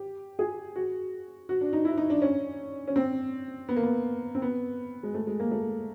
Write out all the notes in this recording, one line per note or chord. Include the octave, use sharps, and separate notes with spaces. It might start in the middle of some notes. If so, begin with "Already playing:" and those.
Already playing: G4
G#4
F#4
F#4
D4
D#4
E4
D#4
D4
C#4
C#4
C4
B3
A#3
B3
C4
B3
G#3
A3
G#3
A#3
A3